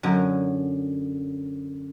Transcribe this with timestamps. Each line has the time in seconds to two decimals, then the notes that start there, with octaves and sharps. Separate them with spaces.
0.03 F#2 D3